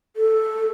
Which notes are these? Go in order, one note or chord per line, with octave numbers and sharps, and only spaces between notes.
A4